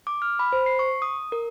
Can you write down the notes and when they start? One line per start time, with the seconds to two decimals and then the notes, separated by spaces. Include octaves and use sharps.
0.07 D6
0.22 F6
0.39 B5
0.53 C5
0.66 C7
0.79 C#6
1.02 D#6
1.32 A#4